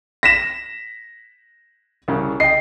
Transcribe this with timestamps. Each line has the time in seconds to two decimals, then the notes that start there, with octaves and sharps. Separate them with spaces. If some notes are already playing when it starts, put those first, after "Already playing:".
0.23 A#6 B6 E7
2.08 C2 C#3
2.40 D#5 G5 C7